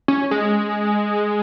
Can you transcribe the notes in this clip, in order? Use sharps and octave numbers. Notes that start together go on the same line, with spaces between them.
C#4
G#3